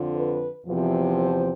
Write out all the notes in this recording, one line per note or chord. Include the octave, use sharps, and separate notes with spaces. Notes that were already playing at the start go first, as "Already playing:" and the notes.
Already playing: F2 D3 F3
B4
E2 C3 F3
C5